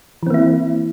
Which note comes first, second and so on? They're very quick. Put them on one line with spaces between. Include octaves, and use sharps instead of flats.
E3 C4 A#3 E4